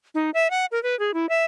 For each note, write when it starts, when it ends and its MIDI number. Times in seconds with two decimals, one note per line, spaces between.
0.15 0.30 63
0.34 0.50 76
0.50 0.66 78
0.72 0.81 70
0.83 0.98 71
0.99 1.14 68
1.14 1.29 64
1.29 1.46 76